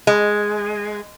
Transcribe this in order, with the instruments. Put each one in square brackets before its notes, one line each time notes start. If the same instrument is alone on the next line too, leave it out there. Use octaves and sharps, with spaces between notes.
[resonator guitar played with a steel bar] G#3